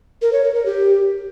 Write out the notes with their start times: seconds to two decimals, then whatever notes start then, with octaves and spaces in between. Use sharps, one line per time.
0.22 A#4
0.33 C#5
0.44 A#4
0.55 A#4
0.66 G4